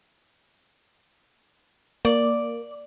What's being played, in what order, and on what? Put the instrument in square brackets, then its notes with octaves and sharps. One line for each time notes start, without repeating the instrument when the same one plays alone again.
[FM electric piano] A#3 [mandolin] D5